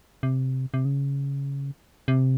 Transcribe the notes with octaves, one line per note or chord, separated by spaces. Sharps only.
C3
C3
C#3
C3